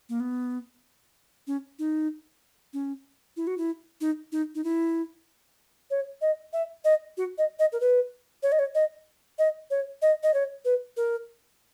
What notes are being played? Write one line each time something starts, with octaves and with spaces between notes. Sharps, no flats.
A#3
B3
C#4
D#4
C#4
E4
F#4
E4
D#4
D#4
D#4
E4
C#5
D#5
E5
D#5
F#4
D#5
D#5
A#4
B4
C#5
D#5
C#5
D#5
D#5
C#5
D#5
D#5
C#5
B4
A#4